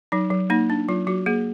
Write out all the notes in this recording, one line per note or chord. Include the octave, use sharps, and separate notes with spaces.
F#3 D#4
F#3
A#3 D#4
D4
F#3 F4
F#3 F#4
A#3 G#4